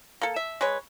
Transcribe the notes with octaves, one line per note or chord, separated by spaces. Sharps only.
A#3 A4
E5
G#3 B4 C#5